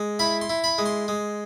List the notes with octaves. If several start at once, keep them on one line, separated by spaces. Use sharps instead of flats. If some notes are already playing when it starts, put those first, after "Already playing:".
Already playing: G#3
E4 B5
C6
E4
B5
G#3
C6
G#3